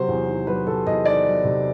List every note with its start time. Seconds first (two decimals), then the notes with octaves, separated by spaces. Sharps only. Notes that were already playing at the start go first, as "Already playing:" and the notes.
Already playing: C3 F#3 C5
0.08 E2
0.27 D#3
0.47 F#3 B4
0.67 C3 A4
0.86 E2 D#5
1.05 D#3 D5
1.26 F#3
1.44 C3